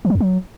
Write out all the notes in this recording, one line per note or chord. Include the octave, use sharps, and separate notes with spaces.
E3
F#3
E2
F#3